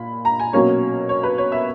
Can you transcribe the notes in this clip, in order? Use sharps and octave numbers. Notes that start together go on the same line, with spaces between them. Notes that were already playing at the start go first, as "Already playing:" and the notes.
Already playing: A#2 B5
A#5
G#5
B2 F#3 A#3 C#4 C#5
C#5
B4
C#5
E5